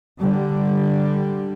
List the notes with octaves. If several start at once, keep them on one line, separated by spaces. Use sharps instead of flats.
D3 G3